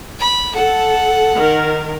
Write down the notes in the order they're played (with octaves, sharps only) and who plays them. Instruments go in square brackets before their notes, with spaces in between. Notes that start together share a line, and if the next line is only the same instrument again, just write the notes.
[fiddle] B5
[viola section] A4 [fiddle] F#5
[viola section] D#3 A#4